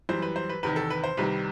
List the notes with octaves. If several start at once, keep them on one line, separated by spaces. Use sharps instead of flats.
F#2 E3 G3 C5
B4
C5
B4
E2 C3 D#3 B4
A4
B4
C5
C2 C3 D#3 G3 B4